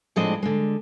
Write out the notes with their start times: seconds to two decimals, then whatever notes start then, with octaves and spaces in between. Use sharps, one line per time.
0.16 A2 F3 G#3 C4 D4 D#5
0.43 D3 G#3